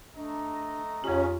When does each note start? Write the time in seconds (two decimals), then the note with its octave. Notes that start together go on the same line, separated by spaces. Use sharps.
0.16 A3 D4 D#5 A#5
1.04 F2 C#3 C#4 F4 G4